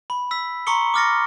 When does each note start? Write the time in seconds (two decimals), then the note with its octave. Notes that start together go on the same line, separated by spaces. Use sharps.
0.10 B5
0.31 E6 B6
0.67 A#5 C6 C#6 D#6 C#7 G7
0.94 D6 D#6 F6 A6 A#6 C#7